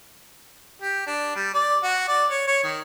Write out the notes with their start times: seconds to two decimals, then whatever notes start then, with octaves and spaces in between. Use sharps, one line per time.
0.82 G4
1.07 D4
1.35 G3
1.54 D5
1.83 F#4
2.08 D5
2.30 C#5
2.47 C#5
2.64 D#3